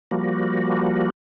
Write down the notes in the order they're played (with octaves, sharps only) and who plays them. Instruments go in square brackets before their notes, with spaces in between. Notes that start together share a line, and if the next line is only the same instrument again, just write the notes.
[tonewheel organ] F3 G3 A#3 F#4